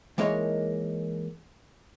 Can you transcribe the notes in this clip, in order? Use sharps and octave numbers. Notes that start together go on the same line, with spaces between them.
E3 G#3 A#3 D#4 A#4 C#5